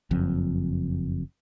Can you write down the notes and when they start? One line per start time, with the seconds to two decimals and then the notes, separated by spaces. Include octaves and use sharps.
0.11 F#1 F2